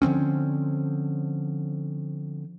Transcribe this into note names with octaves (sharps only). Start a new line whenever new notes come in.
D3 F3 C4 C#4